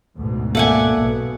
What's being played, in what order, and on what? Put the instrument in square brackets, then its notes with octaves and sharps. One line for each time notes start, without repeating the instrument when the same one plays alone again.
[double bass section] D2 G#2 B2
[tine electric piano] A#3 A4 E5 [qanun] D5 F#5 G#5
[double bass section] B1 B2